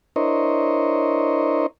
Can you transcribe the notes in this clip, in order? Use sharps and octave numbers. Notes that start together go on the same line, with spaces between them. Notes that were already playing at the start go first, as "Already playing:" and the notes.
D4 E4 A#4 C5 C#5 D#5